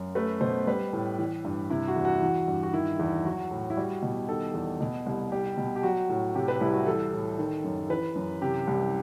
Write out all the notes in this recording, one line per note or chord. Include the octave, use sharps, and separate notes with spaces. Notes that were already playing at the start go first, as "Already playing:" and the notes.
Already playing: F#2
A3 B4
B2 C5
G3 B4
A2
E3
G2
C3 E4
F#4
E2
F#4
E3
G2
F#4
D#3 E4
E2
F#3 F#4
A2
E4
G3 F#4
B2
D#3 A4
E2
B2
C2
G3 G4
B2
G4
F#3 F#4
A2
C3 G4
B4
C2 E4
F#4
E3 A4
A2
D#3
F#2
E3 B4
F#2
C3 G4
C2